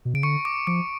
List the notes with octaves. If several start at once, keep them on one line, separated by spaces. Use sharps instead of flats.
B2
C#3 D7
D3 C#6 C#7
D6 D7
F3 D6 D7